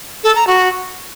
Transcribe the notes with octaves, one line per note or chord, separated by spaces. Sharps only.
A4
A#5
F#4